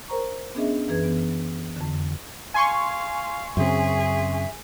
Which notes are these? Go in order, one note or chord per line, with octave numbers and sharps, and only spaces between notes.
A#4 C5 A#5 C#6
B3 C#4 D4 G#4 D#5 E5
F#2 E3 G#4 B4 G#6
E3 B3
F2 D3
F5 G#5 C6 C#6
F#2 C#3 C4 G#4 E5